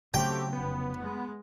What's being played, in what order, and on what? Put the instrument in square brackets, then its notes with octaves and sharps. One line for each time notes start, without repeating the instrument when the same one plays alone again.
[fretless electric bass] C#3 F#3 [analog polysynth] A3 G4 [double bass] C4 [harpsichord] G5
[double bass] F1 [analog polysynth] B3
[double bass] G#3